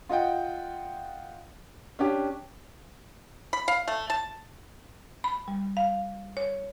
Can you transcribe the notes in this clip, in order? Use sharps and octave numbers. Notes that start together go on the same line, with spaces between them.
F4 D#5 F#5 G5
C#4 D4 G4
B5
F5
A3
A5
B5
G3
F5
C#5